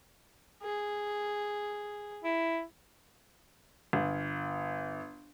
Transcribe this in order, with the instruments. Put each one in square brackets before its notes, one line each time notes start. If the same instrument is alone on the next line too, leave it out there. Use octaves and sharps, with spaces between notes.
[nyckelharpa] G#4
[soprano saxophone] E4
[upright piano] G1